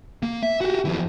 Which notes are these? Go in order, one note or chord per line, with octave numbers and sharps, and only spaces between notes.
A#3
E5
F#4 G4
F2 E3